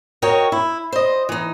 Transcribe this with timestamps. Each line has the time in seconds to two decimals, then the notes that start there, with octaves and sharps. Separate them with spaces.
0.22 F#4 A#4 C#5 D#5 G5
0.52 E4
0.92 C5 D#5
1.29 E3 D#4